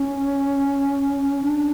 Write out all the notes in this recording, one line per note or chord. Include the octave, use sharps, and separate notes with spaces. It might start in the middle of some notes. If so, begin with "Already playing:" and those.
Already playing: C#4
D4